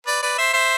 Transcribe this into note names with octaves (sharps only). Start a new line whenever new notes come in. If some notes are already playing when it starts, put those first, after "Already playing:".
B4 D5
B4 D5
C5 E5
C5 E5